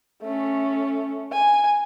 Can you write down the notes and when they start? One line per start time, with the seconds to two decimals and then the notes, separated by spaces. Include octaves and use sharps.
0.23 A3 C#4
1.32 G#5